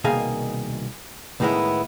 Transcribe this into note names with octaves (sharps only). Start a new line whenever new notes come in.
C2 B2 D#3 A#3 G#4 F5
C#2 A2 D#3 G#3 B3 E4